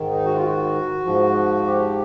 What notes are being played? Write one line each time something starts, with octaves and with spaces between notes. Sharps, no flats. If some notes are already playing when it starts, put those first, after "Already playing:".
Already playing: G#2 D#3
D#4
F#4
F4
F#4
G#2 F3
G4